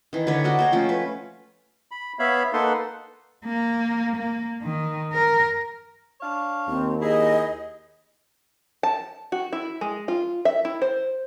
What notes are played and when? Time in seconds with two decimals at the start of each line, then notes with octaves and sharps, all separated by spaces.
0.13 D#3 E3
0.27 D3 D4 B4 C#5
0.44 F#4 A#4 D5 D#5
0.59 C5 C#5 G5
0.72 F3 A3 C#4
0.89 B4
1.91 B5
2.19 B3 C#5 E5 F5 B5
2.53 A#3 D#4 A4 B4 F#5 C6
3.45 A#3
4.16 A#3
4.62 D#3
5.13 A#4
6.20 D4 C#5 F5
6.68 D#2 C4
7.02 E4 G#4 D#5
8.83 A5
9.32 F#4
9.53 E4
9.81 G#3
10.08 F4
10.45 E5
10.65 E4
10.82 C5